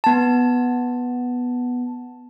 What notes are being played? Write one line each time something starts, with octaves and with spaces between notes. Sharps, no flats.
B3 A5